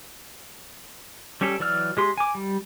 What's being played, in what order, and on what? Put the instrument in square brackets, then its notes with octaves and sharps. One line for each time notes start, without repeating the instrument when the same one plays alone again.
[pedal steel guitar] G3 C#4 G4 A4
E3 F#3 D5 E6 F6
G#3 G4 C6
G#5 D6
G3